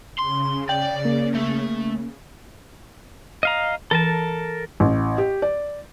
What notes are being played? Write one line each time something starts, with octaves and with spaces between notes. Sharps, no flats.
C#3 C6
D5 G5
A#3
A3
D#5 F5 A#5
E3 A4 A#4 A5
A1
G4
D5